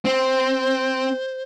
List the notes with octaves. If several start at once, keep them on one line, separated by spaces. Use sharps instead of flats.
C4 C5